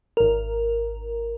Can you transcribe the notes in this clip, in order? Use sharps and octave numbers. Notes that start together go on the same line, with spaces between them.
G#1 A#4